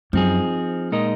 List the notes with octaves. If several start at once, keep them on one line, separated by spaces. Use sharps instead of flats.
F#2 F3 C4 D#4 G#4
A#2 G#3 D#4 A#4 D#5